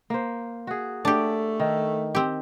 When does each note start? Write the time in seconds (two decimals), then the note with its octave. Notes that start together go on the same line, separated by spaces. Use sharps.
0.10 A#3 C5
0.67 F#4 G#4
1.05 A3 D4 G4 C#5 D5
1.60 D#3
2.15 C4 G4